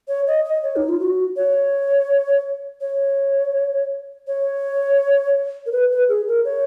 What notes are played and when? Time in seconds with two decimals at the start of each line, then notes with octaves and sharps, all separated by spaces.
0.08 C#5
0.27 D#5
0.45 D#5
0.63 C#5
0.76 D#4
0.89 F4
0.99 F#4
1.36 C#5
2.81 C#5
4.27 C#5
5.66 A#4
5.72 B4
5.91 B4
6.09 G#4
6.28 A#4
6.45 C#5